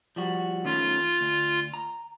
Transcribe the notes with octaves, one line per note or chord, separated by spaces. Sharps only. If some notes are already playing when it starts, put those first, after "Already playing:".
F3 G3 F#4
D#3 A3 C#4 F4
D2
A#5